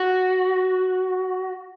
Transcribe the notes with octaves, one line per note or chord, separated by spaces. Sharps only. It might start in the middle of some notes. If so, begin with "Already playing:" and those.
Already playing: F#4